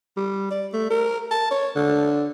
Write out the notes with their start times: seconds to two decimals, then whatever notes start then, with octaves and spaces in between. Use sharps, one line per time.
0.17 G3
0.51 D5
0.73 A3
0.90 A#4
1.31 A5
1.51 C#5
1.76 D3